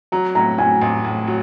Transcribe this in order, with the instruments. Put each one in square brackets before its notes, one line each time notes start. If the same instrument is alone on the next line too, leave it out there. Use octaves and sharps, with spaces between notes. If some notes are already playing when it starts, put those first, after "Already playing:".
[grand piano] F#3 [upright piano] A#5
[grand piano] A2 [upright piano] A#5
[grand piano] A2 [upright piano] G#5
[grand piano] A1
A2
F#3